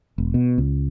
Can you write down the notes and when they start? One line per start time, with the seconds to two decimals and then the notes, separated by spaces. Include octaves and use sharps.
0.18 E1
0.34 B2
0.58 C#2